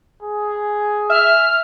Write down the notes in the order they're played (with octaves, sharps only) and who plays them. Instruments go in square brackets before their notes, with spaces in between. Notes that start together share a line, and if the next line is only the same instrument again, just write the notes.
[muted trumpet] G#4
[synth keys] E5 [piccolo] F6